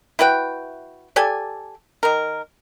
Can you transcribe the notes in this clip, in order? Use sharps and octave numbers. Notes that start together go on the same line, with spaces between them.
E4 F#4 B4 G5
G4 A4 D5 G#5
D#3 A#4